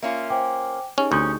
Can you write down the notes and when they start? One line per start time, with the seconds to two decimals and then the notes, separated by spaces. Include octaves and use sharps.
0.02 A#3 C#4 F4 E5
0.30 C5 G5 G#5 D6
0.98 C#4 D#4 G4 G#4
1.12 D2 C#4 C#6 D#6 G6